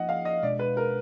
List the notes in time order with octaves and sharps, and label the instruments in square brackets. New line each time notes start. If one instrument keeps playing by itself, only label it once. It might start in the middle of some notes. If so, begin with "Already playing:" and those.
Already playing: [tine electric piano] F3 A#3 D#4 [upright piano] D#5 F#5
[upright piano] F5
D#5
[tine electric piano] B2 G#3 D4 [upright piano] D5
[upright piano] B4
A#4